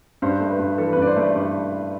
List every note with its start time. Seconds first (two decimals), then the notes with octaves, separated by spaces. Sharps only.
0.22 G2 C5
0.40 A3
0.51 B4
0.59 G2
0.78 E3 A4
0.93 B4
0.97 G2
1.02 D5
1.07 C5
1.16 A3 D5
1.35 G2 D5